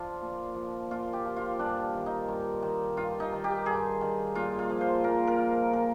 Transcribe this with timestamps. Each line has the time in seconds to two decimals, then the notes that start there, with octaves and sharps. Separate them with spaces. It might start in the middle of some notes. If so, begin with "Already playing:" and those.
Already playing: F3 D4 F4
0.22 A#2
0.56 F3
0.91 A#2 F4
1.13 G4
1.26 F3
1.36 F4
1.59 G2 D4
1.94 D#3
2.06 D#4
2.28 G2
2.62 D#3
2.97 G2 F4
3.20 D#4
3.32 D#3
3.44 G4
3.66 G2 G#4
4.01 D#3
4.35 A#2 F4
4.59 F4
4.69 F3
4.81 C5
5.04 A#2 A#4
5.27 A#4
5.38 F3
5.73 A#2 A#4